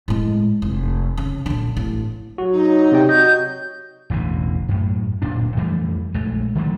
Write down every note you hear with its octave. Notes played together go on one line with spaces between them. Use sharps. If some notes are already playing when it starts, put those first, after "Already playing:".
A2 G#3
F1
C#3
A#2 D3
A1
F#3 F#4
D#4
C3 D5 G5
F#4 D#5 G6
E1 A1 B2 D3
F#2 A2
D1 A#2 D4
F2 E3 G3 A3
A#1 G#3 A3
D3 D#3 F#3 A3